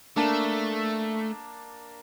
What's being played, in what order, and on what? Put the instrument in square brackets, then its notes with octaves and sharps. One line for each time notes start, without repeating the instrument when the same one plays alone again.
[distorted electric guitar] A3 [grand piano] A#3 D4 A5